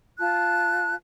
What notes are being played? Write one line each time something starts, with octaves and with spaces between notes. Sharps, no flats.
F4 A5 F#6